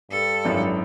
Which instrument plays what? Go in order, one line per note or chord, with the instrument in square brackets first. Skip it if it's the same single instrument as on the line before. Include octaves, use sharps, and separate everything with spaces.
[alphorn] G2 [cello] A4
[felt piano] G#1 F#2 [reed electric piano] D4 E4 B4